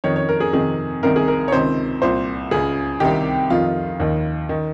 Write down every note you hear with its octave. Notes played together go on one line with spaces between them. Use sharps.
F2 D#3 C#5
C#5
A#4
G#4
F2 C3 D#3 G#4
C2 C3 D#3 A#4
G#4
A#4
C#5
C#2 C3 D#3 C5
C2 A#2 C5
C#2 C#3 G#4
C2 C3 D#3 G4
F2 D#3 F4
D#2 D#3
D#3